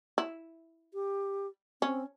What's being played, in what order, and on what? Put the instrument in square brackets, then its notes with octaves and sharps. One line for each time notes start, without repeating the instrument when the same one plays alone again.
[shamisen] E4
[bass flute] G4
[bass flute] C4 [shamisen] C#4